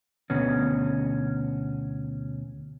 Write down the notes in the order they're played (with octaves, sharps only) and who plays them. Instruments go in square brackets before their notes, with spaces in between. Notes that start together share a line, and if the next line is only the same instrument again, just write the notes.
[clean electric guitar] D2 B2 B3 C#4